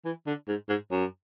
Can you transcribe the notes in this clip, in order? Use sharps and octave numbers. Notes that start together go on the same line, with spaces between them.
E3
D3
G#2
G#2
F#2